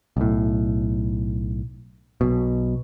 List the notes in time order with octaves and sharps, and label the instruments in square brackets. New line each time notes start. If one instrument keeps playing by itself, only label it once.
[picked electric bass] B1 A2
B1 B2